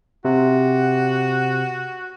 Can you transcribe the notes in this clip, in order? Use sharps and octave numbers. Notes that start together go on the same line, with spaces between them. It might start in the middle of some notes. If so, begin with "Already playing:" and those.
C3 F#4